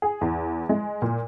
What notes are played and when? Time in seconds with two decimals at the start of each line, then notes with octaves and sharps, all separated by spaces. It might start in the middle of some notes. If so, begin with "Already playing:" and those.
0.02 G#4
0.21 E2
0.69 G#3
1.02 A#2